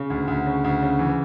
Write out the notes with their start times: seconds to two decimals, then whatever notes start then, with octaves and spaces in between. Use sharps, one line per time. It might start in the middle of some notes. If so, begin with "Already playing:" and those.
Already playing: C#3
0.10 D2
0.28 D2
0.46 C#3
0.64 D2
0.82 C#3
0.99 E3